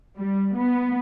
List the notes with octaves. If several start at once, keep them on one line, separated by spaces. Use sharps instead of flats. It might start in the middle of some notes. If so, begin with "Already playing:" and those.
G3
B3